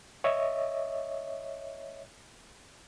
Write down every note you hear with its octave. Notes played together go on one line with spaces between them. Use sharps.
C#5 D#5 E5